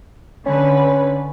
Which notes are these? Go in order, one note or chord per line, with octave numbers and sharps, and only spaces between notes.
D3 C#4 B4